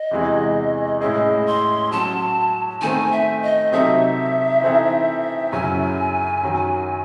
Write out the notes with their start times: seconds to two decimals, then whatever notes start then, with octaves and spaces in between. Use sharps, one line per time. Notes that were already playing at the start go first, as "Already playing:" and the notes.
Already playing: D#5
0.11 E2 C3 E3 G#3
1.01 A2 G#3 C#4 E4 G#4 D#5
1.47 C6
1.91 F#3 C#4 F#4 A5
2.82 D#3 A3 C4 G#5
3.12 E5
3.42 D#5
3.72 C3 F#3 C4 D#4 A4 E5
4.62 E3 C4 D#4 A4
5.52 F#2 C#3 F#3 C#4 E4 G#5
6.43 F#2 D#3 F#3